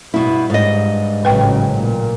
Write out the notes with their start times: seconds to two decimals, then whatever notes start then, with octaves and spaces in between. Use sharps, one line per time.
0.14 G2 B2 E4
0.50 G#2 D#5
1.25 A1 C#3 F#3 B4 G5
1.74 A#2